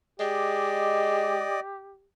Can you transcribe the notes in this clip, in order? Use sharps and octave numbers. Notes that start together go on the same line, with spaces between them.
G#3 G4 D5 D#5